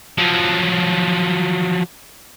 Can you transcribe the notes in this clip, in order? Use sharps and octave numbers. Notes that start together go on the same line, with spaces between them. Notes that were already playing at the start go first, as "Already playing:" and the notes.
F3 F#3